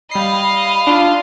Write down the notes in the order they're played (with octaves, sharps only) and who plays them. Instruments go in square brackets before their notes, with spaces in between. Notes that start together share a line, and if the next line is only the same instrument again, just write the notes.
[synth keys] G3 C7 [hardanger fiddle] D#5 F5 [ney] B5
[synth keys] D4 F4